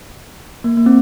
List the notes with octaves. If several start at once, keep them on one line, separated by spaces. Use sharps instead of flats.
A#3
A#3
C4